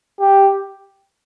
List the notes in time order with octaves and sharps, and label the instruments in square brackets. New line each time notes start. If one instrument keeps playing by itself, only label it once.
[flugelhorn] G4